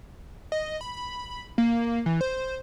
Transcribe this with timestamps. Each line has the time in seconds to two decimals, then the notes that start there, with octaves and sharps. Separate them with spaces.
0.52 D#5
0.81 B5
1.58 A#3
2.06 E3
2.21 C5